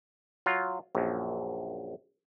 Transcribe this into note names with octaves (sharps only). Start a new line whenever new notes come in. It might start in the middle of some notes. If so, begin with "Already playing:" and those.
F#3 F4
A#1 F#2